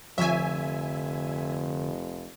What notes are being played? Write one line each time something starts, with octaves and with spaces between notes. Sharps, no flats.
F1 D3 F3 C#5 E5 G#5